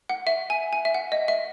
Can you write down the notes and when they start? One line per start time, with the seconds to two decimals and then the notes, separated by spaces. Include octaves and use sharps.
0.09 F#5
0.27 E5
0.50 G#5
0.73 G#5
0.85 E5
0.94 F#5
1.12 D#5
1.28 E5